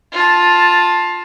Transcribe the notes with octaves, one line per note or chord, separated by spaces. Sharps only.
F4 A5